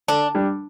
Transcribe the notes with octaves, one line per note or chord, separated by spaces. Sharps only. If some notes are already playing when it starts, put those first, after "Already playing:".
D3 D4
G3 D4